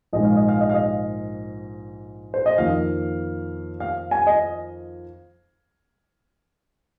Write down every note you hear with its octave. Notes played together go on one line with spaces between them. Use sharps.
A#1 G#2 G#3 D#5
F5
D#5
F5
D#5
F5
D#5
C5
D#5
F2 D#3 A#3 F5
F5
G#5
D#5